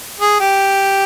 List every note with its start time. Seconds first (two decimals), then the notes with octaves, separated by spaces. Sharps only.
0.20 G#4
0.40 G4